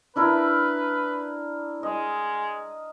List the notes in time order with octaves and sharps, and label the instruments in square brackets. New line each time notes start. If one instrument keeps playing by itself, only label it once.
[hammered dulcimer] D4 E4 A#4 [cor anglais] B4
[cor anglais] G#3 [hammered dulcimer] D#5